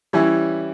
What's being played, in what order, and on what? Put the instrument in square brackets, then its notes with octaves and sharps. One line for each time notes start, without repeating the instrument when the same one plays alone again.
[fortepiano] E3 G3 C#4 E4 C#5